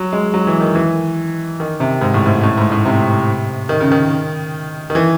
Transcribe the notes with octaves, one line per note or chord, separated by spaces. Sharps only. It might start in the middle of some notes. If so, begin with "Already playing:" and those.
Already playing: F#3
G#3
F#3
E3
D#3
E3
D#3
C3
G#2
A2
G#2
A2
G#2
A2
C3
D#3
C#3
D#3
D#3
E3